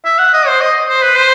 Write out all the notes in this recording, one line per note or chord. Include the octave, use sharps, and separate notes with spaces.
E5
F#5
D#5
C5
D#5
C5
B4
C5